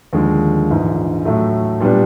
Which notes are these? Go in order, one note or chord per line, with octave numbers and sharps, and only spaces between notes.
D#2 D3 F3 G#3
A#1 G#2 E3
A2 F#3 A3
A#2 G3 B3 D4